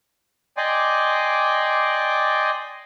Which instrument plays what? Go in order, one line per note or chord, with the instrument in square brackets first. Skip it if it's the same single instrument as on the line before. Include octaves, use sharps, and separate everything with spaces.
[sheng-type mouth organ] D5 D#5 G5 G#5 C6 D6